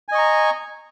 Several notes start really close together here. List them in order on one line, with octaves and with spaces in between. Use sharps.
G#5 D#5 C#6 A#5